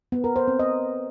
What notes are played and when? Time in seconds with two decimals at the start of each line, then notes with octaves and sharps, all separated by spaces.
0.12 B3
0.24 A#4
0.36 C5
0.48 C4
0.59 D#5